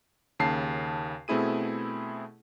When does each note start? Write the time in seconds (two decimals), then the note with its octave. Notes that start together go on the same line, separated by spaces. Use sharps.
0.40 D#2 C#3 A5 C7
1.28 B2 A3 C4 E4 G#4 D#7